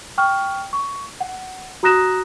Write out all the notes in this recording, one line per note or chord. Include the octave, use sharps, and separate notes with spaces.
G5 C#6 F6
C#6
F#5
F#4 A#5 D#6 F#6 A#6 E7